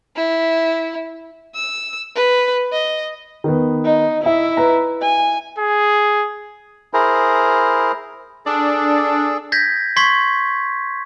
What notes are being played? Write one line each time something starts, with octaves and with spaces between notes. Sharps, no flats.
E4
E6
B4
D#5
D#3 B3
D#4
E4 D#5 E5
B4 A#5
G#5
G#4
E4 G#4 A#4 C5
D4 G#4 A4
G6 G#6 A#6 B6
C6 C#6 G#6 B6 C7